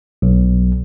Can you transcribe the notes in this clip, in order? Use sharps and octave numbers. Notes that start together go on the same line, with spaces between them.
B1